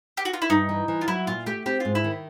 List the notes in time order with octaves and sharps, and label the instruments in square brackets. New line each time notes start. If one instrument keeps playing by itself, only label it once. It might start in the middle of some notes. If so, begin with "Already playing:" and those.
[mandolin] G4
F#4
F4
E4
[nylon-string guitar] G2 [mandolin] D#4
[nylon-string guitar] E3
E3
[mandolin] F4
[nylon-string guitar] F#3 [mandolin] E4
[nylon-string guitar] A#2 [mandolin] F4
[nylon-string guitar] A3 [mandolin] G4
[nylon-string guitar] C4 [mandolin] G4
[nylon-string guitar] G#2 [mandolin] F4
[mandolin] E4
[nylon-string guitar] D#3